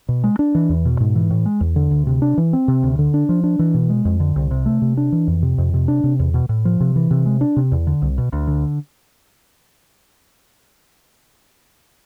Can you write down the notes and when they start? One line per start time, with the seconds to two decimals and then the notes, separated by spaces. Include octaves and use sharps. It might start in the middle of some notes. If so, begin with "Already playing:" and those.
0.09 B2
0.24 G#3
0.39 D4
0.55 E3
0.69 E2
0.85 B2
1.00 G#2
1.15 E3
1.31 A2
1.46 G#3
1.61 E2
1.76 D3
1.91 D2
2.07 C3
2.22 D4
2.38 E3
2.53 C4
2.68 C3
2.83 D2
2.99 D3
3.14 D4
3.29 F3
3.44 D4
3.59 E3
3.74 B2
3.90 G#3
4.05 F2
4.20 D3
4.36 C2
4.51 C3
4.66 A3
4.82 C3
4.97 D4
5.12 E3
5.27 F2
5.43 C3
5.58 F2
5.74 C3
5.88 D4
6.04 C3
6.19 E2
6.34 B2
6.49 A2
6.65 F3
6.80 C3
6.96 E3
7.11 C3
7.26 G#3
7.41 D4
7.56 C3
7.72 E2
7.87 D3
8.02 C2
8.18 B2
8.33 D2
8.47 D3